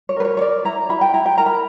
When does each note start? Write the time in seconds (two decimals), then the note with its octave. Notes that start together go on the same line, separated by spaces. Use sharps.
0.09 C#5
0.16 A#4 B4
0.25 C#5
0.37 C#5
0.41 A#4 D5
0.65 E4 A#5
0.89 E4 B5
1.01 G5
1.14 E4 A#5
1.26 G5
1.38 A#4 A#5
1.46 B5